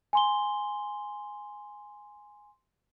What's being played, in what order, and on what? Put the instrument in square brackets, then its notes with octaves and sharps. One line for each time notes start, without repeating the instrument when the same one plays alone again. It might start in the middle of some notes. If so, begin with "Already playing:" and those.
[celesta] G#5 C6 G7